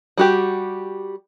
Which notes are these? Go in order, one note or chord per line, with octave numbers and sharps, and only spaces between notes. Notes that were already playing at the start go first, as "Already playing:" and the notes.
G3 F#4 G4